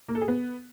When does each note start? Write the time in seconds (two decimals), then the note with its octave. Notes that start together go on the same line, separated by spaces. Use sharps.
0.08 A#3
0.15 A4
0.21 G#4
0.28 B3